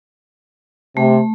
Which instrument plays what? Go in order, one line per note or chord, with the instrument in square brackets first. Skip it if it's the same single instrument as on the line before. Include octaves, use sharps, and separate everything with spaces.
[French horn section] C3 [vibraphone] A3